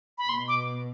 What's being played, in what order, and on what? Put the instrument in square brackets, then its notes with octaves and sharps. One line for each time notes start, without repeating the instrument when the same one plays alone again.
[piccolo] B5
[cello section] B2 [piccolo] C6
[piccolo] D6